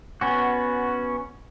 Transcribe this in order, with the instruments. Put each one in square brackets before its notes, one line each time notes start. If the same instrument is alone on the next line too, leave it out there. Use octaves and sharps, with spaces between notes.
[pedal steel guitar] B3 C#4 F#4